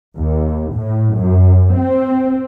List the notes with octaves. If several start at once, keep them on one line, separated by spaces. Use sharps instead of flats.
D#2
A2
F#2
C4